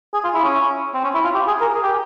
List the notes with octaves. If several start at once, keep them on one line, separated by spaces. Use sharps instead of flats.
G#4
F4
E4
C#4
C4
C#4
E4
F4
G4
G#4
A#4
G#4
G4